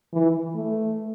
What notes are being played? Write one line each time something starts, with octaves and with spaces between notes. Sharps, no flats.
E3
A3